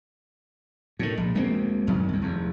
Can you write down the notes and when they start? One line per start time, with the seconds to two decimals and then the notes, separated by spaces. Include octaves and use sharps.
0.99 A2 D#3
1.18 A#1
1.35 D2 G#3 A#3 C4
1.87 G#1 F#2 D#3 F#3
2.09 C2 F#2
2.22 F1 E2